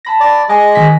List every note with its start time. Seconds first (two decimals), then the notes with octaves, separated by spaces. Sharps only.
0.05 A5 B5 A#6
0.20 D5
0.49 G#3 D#5 G#5 D6
0.75 D#3 G#5 B6